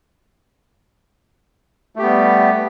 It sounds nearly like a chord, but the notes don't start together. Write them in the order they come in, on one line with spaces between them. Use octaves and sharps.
A3 G4 B3 G3